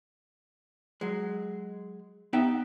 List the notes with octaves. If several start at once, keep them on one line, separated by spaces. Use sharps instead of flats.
F#3 G#3
B3 D#4 G4 E5 G5